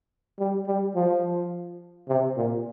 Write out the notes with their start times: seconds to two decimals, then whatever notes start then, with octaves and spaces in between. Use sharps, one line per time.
0.39 G3
0.67 G3
0.95 F3
2.08 C3
2.36 A#2